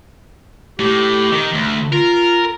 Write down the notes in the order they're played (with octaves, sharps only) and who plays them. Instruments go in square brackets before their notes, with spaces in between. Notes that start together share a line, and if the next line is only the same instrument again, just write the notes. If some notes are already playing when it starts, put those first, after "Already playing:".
[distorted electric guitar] A2 [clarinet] G4
[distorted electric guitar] D#3
D2
[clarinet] F4 [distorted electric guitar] A#4